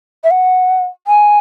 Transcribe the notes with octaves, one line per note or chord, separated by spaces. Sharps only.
E5
F#5
G#5